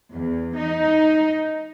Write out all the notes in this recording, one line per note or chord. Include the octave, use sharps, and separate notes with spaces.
E2
D#4